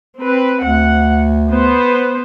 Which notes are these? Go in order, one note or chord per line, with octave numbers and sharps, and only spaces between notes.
C4 B4
D2 F#5
B3 B4 C5